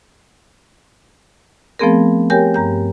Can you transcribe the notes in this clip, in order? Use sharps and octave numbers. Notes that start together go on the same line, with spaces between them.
F3 A3 B3 C4 G#4 A#4
G4 A#4 C#5 G5 G#5 G6
G2 A#5 G6